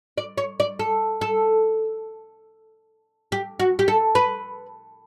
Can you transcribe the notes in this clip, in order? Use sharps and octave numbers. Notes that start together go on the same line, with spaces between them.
D5
C#5
D5
A4
A4
G4
F#4
G4
A4
B4